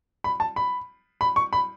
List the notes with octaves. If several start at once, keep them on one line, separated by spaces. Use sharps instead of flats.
B5
A5
B5
B5
C#6
B5